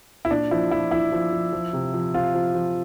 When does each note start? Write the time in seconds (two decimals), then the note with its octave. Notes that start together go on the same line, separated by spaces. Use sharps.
0.25 E4
0.31 A#2 D4
0.51 F3 E4
0.71 F3 E4
0.91 F3 E4
1.12 F3
1.33 F3
1.53 F3
1.73 C3
1.94 F3
2.14 C3 F4
2.34 F3
2.55 F3